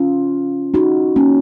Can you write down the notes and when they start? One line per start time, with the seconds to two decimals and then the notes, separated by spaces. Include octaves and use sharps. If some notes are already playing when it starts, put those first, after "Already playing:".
Already playing: C#4 F4
0.74 D#4 F#4
1.16 A#3 C#4